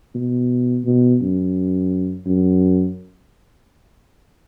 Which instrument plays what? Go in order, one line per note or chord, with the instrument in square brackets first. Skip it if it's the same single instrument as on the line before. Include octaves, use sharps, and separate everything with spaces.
[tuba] B2
B2
F#2
F#2